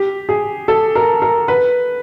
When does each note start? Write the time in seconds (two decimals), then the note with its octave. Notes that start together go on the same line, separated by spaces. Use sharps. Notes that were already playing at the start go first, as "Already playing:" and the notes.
Already playing: G4
0.29 G#4
0.68 A4
0.95 A#4
1.22 A#4
1.48 B4